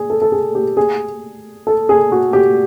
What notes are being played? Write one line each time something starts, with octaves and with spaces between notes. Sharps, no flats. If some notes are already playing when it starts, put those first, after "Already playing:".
Already playing: G#4
A4
A4
G#4
G4
G#4
A4
G#4
F#4
G4